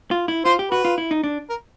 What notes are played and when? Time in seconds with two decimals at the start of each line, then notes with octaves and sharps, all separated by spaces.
0.11 F4
0.28 E4
0.45 F4 C5
0.59 G4
0.71 F#4 B4
0.85 F4
0.98 E4
1.11 D#4
1.24 D4
1.50 A#4